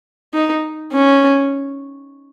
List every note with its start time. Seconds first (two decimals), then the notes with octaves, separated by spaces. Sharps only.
0.34 D#4
0.92 C#4